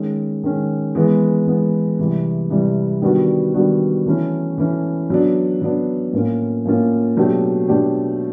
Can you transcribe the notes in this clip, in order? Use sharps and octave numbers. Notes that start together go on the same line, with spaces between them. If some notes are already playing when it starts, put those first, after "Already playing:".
Already playing: D#3 G#3 C#4
D#3 G#3 C#4
E3 G#3 B3
E3 G#3 B3
C3 E3 G3
C3 E3 G3
D#3 G3 B3 D4 F#4
D#3 G3 B3 D4 F#4
E3 A3 C#4 E4
E3 A3 C#4 E4
F#3 B3 D4
F#3 B3 D4
A2 F3 A#3 C#4 F4
A2 F3 A#3 C#4 F4
B2 F#3 A3 D4 G4
B2 F#3 A3 D4 G4